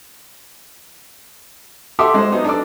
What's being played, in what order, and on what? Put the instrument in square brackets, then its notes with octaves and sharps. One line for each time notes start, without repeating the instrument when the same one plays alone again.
[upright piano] F#4 G4 A4 E5 C6 D6
G#3 C5
F#3 B3 D#4
D4 A4 D5 D6